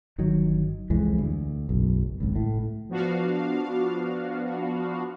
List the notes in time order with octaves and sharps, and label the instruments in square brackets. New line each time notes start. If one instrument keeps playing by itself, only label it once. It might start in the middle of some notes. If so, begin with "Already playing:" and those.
[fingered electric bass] G1 D#3 F#3
C2 F2 E3 G#3
D2
F#1 B1
G#1 C#2
A2
[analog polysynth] F3 B3 D4 F#4 F5